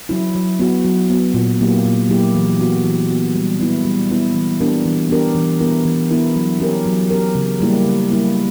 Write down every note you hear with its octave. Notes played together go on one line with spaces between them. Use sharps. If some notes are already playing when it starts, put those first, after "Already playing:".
F#3 C#4 E4
F#3
B3 F#4
F#3
B3 F#4
A#2
F#3 A#3 E4 G4
A#2
F#3 A#3 E4 G4
E3
B3 F#4
E3
B3 F#4
G3
B3 E4
G3
B3 E4
E3
B3 D4 G4 A#4
E3
B3 D4 G4 A#4
E3
B3 E4 A#4
E3
B3 E4 A#4
F#3
C#4 G4 A#4
F#3
C#4 G4 A#4
C#3
G3 A#3 E4 G4
C#3
G3 A#3 E4 G4